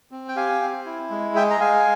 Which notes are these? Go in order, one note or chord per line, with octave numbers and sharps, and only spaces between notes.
C4
G5
G4 F5 G#5
C4
E4
G#3
G#4 E5 G5
A#5
G#3 F5 G#5